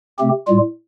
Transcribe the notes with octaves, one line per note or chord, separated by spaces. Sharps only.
C3 A3 C4 G4
A2 G3 F4